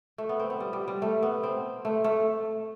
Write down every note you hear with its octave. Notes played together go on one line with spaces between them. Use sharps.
A3
B3
C4
B3
G3
G3
G3
A3
B3
C4
A3
A3